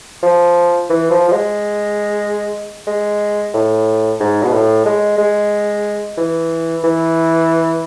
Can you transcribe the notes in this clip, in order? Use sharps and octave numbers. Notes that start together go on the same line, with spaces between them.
F3
E3
F3
F3
G#3
G#3
A2
G#2
B2
A2
G#3
G#3
E3
E3